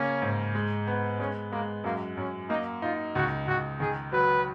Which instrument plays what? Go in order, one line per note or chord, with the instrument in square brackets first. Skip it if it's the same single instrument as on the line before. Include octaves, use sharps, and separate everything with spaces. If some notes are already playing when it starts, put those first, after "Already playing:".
Already playing: [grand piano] C#3 A#3 [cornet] C#4
[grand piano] G#2
G#3
B3
[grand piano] G#3 [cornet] C#4
[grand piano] G#3 [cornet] A#3
[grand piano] F#2 [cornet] A#3
[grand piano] F#2 [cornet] C#4
[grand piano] A#3 [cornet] D#4
[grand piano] D#4 [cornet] F4
[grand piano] C#2 [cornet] F#4
[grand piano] C#2 [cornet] F#4
[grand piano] D#3 [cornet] G#4
[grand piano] F#3 [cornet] B4